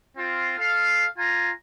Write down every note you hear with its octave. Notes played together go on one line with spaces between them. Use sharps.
C4 F4
A4 F5
F4 G#5 A#5